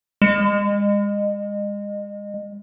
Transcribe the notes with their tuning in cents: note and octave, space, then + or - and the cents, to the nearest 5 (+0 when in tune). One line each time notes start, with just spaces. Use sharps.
G#3 -30